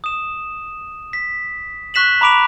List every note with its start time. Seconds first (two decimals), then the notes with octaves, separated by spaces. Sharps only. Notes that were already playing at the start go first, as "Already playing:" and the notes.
0.04 D#6 E7
1.13 B6
1.94 C#6 F#6 B6 E7 F#7
2.21 A#5 B5 D6 D7 F7